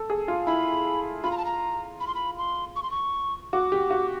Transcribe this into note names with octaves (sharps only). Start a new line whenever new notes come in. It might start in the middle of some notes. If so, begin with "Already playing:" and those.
Already playing: A4
G#4
F4
E4 B5
F4 B5
A#5
A5
A#5
B5
C6
B5
C6
C#6
C6
C#6
F#4 D6
G4
F#4